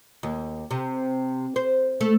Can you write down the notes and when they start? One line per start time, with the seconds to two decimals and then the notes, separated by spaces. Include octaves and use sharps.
0.23 D#2
0.71 C3
1.56 C5
2.01 A3